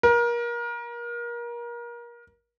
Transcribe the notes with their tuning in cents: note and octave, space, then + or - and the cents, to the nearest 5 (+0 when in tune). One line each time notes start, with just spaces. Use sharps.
A#4 +30